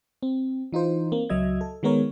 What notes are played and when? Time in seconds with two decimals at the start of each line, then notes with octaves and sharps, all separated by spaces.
0.23 C4
0.73 E3 D#4 F4 C5
1.12 A#3 C4
1.30 C#2 F#3 D#5 E5 G#6
1.61 A4
1.83 D#3 G#3 B3 A#4 C#5